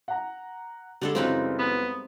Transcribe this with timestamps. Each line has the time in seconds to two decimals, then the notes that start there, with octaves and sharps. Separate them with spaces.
0.08 F#5 A#5
1.02 D3 G3 G#3 A4
1.15 F#2 C#3 E3 C4 D#4 B4
1.59 B3